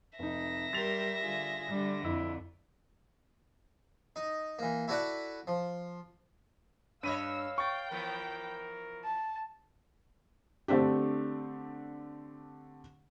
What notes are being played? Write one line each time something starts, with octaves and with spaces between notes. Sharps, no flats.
F1 D#4 E5 A#6
G3 G4 A#4 C6 A6 F7
D3 F4 G#4
D3 G3 D4
F2 E4
D#4
E3 A#3
E4 F#4 A4 B4 D5 F#5
F3
G2 B4 C#5 D#5 F5 E6 D#7
G5 C#6 A6
E3 F3 B3 A#4
A5
D3 A3 C4 D4 G4